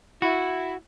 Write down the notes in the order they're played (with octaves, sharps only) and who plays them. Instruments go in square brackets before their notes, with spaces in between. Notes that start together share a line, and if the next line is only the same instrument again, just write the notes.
[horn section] E4 [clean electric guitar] F#4